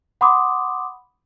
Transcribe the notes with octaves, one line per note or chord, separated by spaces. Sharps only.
F#5 B5 C6 D6 D#6